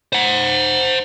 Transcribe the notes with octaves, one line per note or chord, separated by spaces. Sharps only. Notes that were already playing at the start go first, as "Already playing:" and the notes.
C5 F#5